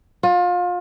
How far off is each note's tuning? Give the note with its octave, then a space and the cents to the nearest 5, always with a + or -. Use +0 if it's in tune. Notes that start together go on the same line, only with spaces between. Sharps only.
F4 +30